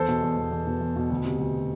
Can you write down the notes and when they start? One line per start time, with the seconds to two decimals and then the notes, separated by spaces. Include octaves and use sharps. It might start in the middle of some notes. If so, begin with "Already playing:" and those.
Already playing: E2 A4 C5
0.08 B2
0.23 E2
0.38 E2
0.52 E2
0.67 B2
0.81 E2
0.96 B2
1.10 D2
1.25 C3
1.40 D2